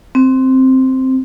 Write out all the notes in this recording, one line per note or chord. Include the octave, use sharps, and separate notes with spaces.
C4